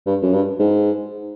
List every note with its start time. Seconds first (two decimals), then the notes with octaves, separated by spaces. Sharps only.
0.07 G2
0.22 F#2
0.33 G2
0.60 G#2